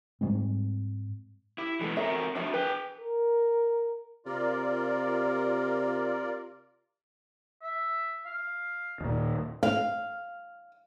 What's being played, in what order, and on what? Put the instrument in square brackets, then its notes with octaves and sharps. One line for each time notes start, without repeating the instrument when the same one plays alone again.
[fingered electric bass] G#2 G3 G#3 C4
[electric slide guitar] E4 [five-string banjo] G4
[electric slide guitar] E3 G#3 B3 [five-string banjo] A4
[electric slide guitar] C4 F#4 A#4 [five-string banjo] A4 E5
[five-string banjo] F3 E5 [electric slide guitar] D4 F#4 G#4
[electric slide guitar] G#4 G5 [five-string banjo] B4
[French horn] A#4
[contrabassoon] C3 [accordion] F4 A#4 D5
[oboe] E5
F5
[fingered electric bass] D#2 A#2
[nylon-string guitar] F5